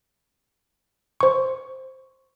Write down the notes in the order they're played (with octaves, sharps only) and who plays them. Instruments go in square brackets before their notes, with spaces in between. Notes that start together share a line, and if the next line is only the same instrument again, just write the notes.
[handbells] C5 C#6